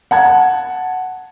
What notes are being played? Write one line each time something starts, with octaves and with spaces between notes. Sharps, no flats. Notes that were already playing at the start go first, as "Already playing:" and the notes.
F#5 A5 G#6